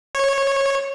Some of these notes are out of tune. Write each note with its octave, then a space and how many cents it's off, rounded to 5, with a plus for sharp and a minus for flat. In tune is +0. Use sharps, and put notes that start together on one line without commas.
C#5 -15